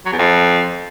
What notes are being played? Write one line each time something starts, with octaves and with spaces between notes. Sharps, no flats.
F#3
E2
F2